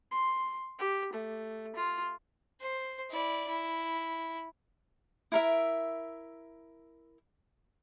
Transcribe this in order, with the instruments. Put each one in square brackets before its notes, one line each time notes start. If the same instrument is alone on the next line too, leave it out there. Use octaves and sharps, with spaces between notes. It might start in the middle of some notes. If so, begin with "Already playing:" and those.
[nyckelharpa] C6
G4
A3
F4
[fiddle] C5
E4 D5
E4
[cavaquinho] E4 A#4 E5